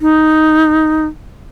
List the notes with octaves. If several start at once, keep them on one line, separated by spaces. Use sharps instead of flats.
D#4